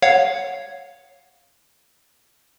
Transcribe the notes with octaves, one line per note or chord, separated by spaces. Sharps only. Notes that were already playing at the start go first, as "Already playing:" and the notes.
C#5 F5 F#5